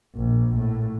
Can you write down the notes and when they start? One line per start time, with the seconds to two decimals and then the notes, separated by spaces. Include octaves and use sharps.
0.15 A#1
0.55 A2